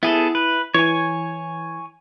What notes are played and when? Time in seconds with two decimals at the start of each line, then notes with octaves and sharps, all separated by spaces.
0.03 B3 E4 G#4 A4
0.35 B4
0.74 E3 C#5 G#5